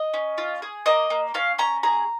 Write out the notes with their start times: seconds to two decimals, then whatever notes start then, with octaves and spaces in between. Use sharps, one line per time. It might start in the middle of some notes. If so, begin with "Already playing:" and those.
Already playing: D#5
0.14 C#4
0.38 F4
0.62 G#4
0.86 A#3 D#5
1.10 A#3
1.34 C#4 F5
1.58 C#4 A#5
1.83 G#4 A#5